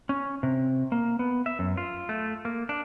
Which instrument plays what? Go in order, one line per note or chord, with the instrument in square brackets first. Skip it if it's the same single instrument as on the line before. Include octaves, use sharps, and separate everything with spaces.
[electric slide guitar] C#4
C3
A#3
B3
E5
F#2
F4
A3
A#3
D4